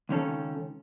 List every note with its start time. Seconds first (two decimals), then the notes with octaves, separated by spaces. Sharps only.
0.09 C#2 D#3 C#4 A4